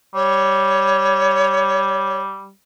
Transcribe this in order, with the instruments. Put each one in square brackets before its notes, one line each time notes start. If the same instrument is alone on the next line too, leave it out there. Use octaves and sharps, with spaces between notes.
[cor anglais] G3 [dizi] C#5